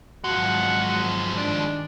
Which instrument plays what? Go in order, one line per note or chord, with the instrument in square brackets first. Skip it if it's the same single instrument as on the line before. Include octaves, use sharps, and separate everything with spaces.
[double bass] G#1 F#3 [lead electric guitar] F3 G#3 [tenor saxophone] F#4
[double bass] G2 D#3 [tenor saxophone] D4